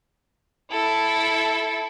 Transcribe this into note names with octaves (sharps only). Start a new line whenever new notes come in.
E4 A4